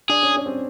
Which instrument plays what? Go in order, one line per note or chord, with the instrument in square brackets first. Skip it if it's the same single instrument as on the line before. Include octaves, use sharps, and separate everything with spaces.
[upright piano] D4 [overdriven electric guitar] G#4
[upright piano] C#4
C#4
C4